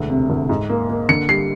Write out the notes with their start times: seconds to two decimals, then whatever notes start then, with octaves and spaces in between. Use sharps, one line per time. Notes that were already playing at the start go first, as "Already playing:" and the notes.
Already playing: E1 D2
0.10 C3
0.30 D2
0.49 G#2
0.70 A#3
0.89 A#3
1.09 D3 C#7
1.29 G3 C7